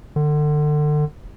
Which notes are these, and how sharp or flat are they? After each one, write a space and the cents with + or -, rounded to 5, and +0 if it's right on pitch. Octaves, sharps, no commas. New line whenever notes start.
D3 +30